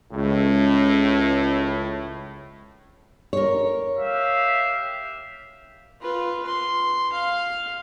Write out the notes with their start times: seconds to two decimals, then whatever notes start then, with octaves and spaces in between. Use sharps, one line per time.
0.12 C#2 A2
3.33 A#4 C#5
3.98 G4 E5 F5
6.01 F4 B4
6.46 C6
7.12 F5